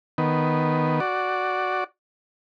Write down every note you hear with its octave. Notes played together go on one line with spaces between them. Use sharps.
D#3 B3
F#4 D5